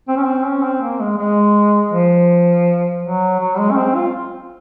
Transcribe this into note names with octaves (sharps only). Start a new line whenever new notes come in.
C4
C#4
C4
C#4
C4
A#3
G#3
G#3
F3
F#3
F#3
G#3
C#4
C4
F4